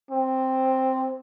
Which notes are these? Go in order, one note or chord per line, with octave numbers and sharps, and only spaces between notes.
C4